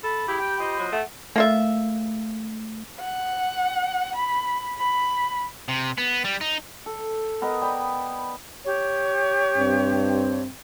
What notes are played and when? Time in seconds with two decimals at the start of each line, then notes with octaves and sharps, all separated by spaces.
0.03 A4 B5
0.28 C#3 E4 G4
0.40 G5
0.60 F4 C5 D#5
0.79 F#3
0.92 A3 F#5
1.36 A3 A#3 F4 E5
3.01 F#5
4.15 B5
4.78 B5
5.68 C3
5.98 B3
6.24 G3
6.41 D#4
6.86 A4
7.42 B3 A#4 D#5
7.62 D5 G5 B5
8.64 G4 C#5
9.57 G2 C4